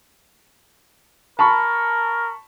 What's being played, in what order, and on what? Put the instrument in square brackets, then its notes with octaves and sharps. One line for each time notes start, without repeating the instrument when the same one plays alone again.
[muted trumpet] A#4 [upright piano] A5 B5 C#6